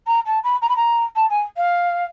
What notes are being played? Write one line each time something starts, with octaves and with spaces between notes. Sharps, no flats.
A#5
A5
B5
A#5
B5
A#5
A5
G#5
F5